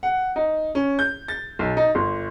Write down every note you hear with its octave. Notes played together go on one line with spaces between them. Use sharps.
F#5
D#4
C#4
G6
A6
B1
D#4
G1